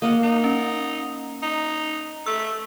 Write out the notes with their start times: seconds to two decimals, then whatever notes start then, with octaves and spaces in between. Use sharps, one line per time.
0.02 A#3 D#5 F5 F#5
0.23 D#4
0.44 C#4
1.42 D#4
2.26 A3 E6